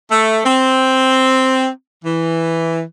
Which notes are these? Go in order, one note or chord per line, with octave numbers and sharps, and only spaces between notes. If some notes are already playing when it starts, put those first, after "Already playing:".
A3
C4
E3